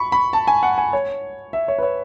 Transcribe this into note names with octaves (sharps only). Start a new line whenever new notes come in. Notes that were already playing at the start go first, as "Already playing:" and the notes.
Already playing: B5 C#6
B5
A5
G#5
F#5
G#5
C#5
E5
C#5
B4
C#5